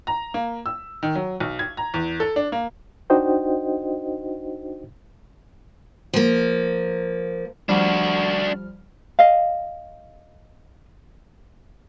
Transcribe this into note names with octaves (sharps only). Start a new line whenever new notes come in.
A#5
A#3
E6
D#3
F#3
B1
G#6
A#5
E2
A4
D4
A#3
D4 D#4 F#4 C5 D#5 G5
F3 A#3
F3 G3 D4 F#4 F6
D#5 F5